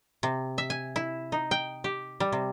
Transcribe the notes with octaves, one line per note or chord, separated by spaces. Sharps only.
C3
E5
G#5
E4
D#4
G5
G4
G3
C3